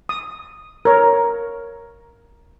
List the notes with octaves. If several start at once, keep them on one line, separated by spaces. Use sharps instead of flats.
D#6
A#4 C#5